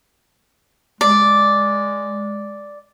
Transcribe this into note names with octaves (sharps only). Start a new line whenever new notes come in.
G#3 D5